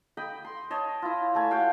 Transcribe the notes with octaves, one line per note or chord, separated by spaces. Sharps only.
D#5 G5 B5
C6
C#5 D#5 A5
E4 F4
A3 A4 G#5
F#4 F5 G5